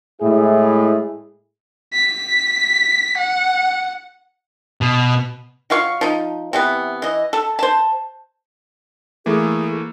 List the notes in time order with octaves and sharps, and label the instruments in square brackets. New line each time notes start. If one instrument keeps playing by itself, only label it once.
[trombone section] A2 G#3 E4 G#4
[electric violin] B6
F#5
[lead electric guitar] B2
[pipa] F#3 F4 F5 C#6
F3 D#4
C3 E3 B3
E3 D#5
A4
C5 A5
[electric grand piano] E3 A3 A#3 [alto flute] G#4